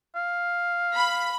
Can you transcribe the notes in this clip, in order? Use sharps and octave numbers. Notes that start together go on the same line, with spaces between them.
F5
B5